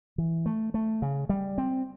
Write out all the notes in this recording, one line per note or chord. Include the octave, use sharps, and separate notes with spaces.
E3
A3
A3
C#3
G3
C4